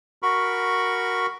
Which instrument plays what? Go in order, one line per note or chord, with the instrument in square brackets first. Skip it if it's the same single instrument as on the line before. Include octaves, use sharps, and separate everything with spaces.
[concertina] F#4 A#4 B5 C#6